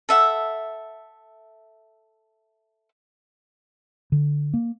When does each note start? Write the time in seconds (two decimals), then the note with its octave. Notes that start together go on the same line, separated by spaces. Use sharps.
0.09 A4 E5 F#5
4.12 D3
4.54 A#3